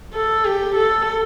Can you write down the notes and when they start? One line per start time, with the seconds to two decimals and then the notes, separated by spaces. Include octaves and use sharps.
0.14 A4
0.45 G4
0.75 A4